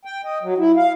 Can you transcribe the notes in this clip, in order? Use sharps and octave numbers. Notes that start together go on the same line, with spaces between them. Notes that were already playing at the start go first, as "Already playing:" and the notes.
G5
D#5
F#3
E4
F5